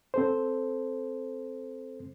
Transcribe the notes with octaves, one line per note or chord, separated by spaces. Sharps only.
C4 A4 C5